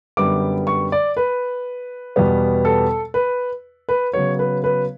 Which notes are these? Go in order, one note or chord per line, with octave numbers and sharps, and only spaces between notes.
F#2 D3 G3 B3 D6
C#6
D5
B4
E2 B2 G3 B3
A4
B4
B4
C#3 F#3 B3 C#5
B4
B4